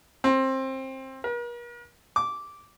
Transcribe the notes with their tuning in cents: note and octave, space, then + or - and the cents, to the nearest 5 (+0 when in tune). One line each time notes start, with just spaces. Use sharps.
C4 +20
A#4 +45
D6 -10